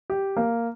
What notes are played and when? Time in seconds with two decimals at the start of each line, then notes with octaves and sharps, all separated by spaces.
0.10 G4
0.37 A#3